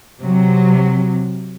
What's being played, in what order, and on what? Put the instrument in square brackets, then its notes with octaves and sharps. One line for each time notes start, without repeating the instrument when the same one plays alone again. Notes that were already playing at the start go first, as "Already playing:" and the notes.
[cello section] C3 F#3